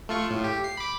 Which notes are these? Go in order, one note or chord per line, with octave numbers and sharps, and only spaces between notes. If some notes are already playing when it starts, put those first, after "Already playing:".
A3 F4 C#6
A2
G4
C7
B5 D6